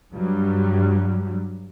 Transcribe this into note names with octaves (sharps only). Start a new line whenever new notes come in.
G2 F#3 G3